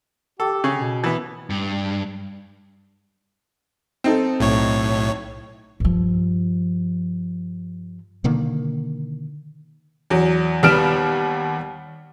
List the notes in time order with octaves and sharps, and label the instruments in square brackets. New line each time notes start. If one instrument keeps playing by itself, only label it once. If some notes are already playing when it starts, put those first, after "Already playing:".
[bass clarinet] G4 [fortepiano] A4
[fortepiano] C#3 C#4
[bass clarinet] B2
[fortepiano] E3 B3
[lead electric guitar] G2
[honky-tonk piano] C4 D#4 A4
[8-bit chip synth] B1 A2 C#5
[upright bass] G2 F3
[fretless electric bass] B2 D3 D#3 A#3
[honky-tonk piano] E2 F#3
D#2 G3 B3 F6 D7 E7